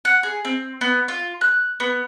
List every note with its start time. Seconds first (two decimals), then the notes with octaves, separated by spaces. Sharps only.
0.05 F#5
0.23 G#4
0.45 C4
0.81 B3
1.08 F4
1.41 F#6
1.80 B3